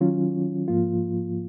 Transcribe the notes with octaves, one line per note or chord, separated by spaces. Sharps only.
D#3 F#3 C#4 F4
G#2 F3 A#3 F4